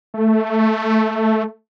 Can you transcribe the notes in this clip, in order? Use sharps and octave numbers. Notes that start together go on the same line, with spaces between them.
A3